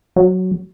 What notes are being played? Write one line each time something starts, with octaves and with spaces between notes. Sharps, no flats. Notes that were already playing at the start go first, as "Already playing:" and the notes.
F#3